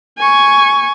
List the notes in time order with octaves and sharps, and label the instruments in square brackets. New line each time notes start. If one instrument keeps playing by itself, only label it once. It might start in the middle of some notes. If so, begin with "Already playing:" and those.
[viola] G#5 C#6